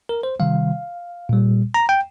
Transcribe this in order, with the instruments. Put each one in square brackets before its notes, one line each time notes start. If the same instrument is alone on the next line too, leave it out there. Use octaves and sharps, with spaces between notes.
[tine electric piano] A#4
C5
C3 D#3 G3 F5
A#2 G3
A#5
G5